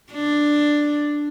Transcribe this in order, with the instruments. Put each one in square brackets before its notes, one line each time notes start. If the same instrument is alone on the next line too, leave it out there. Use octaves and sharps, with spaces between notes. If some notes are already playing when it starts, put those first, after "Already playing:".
[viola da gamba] D4